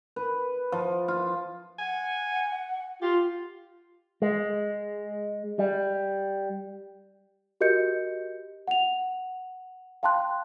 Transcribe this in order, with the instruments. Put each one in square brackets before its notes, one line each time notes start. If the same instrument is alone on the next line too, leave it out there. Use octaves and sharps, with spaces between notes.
[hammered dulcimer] B4
F3
F4
[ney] F#5 [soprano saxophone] G#5
[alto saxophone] F4 [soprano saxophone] G4
[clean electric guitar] G#3
G3
[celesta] F#4 G4 A#4 D#5 G6 C#7
F#5 F7
F5 G5 A5 C6 F#6